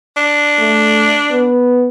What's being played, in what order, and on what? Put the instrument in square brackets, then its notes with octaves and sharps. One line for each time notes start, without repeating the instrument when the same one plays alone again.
[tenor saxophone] D4
[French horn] A3
B3